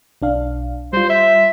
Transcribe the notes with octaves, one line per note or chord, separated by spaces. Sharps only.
B1 D4 F5
G3 F4 C5
E5